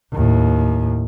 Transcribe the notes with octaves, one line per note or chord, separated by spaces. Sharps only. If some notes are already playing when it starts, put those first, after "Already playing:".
D#2 A2